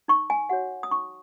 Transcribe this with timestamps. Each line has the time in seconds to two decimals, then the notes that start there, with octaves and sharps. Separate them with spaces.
0.08 D#4 C#6
0.30 G#5
0.49 F#4 C#5 F#5
0.83 D#6
0.91 D#4 C#6